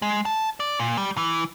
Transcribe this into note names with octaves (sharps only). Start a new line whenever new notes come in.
G#3
A5
D5
A#2
G3
E3